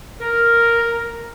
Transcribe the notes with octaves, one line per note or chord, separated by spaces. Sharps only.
A#4